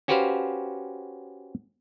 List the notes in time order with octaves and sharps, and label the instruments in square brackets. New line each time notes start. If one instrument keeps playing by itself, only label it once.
[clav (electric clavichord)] C#4 F#4 G4 B4 C5 F5